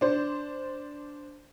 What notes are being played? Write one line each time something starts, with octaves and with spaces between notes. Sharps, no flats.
D4 C5